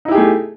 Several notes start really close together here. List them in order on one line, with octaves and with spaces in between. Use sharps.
D#4 E4 G4 G#4 A3